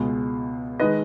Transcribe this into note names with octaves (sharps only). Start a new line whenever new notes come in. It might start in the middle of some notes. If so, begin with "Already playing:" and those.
Already playing: C#2 B2 G#3
D#3 G#3 B4 D#5